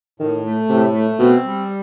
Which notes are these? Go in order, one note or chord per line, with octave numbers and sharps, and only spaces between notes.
A2 D#3
A3
A2 C3
A3
B2 C4
G3